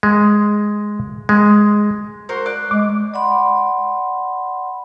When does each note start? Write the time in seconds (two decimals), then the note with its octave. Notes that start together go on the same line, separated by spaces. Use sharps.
0.03 G#3
1.29 G#3
2.29 F#4 A#4 C5
2.46 D5 F#6
2.71 G#3 D6
3.14 D5 F#5 B5 C6